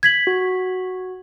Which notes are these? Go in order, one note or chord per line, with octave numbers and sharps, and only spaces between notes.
G#6 B6 F#7
F#4